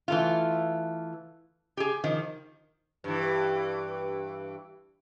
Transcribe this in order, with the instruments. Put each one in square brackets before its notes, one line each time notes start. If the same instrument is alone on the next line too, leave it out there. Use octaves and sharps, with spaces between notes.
[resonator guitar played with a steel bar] E3 A3 F4
G4 G#4
D#3 F3
[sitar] G2 E3